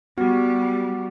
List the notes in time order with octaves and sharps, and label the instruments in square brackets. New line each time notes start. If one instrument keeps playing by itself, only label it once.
[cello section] G3 [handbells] B3 G4 [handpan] F#4